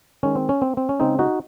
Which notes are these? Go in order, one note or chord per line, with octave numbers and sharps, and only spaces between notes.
D#3 G#3 C#4
C4
C#4
C4
C4
C#4
C#3 G#3 C4 D#4
D#4 F#4